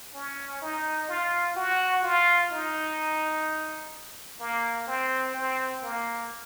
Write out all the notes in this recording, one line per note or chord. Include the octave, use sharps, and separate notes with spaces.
C#4
D#4
F4
F#4
F4
D#4
A#3
C4
C4
A#3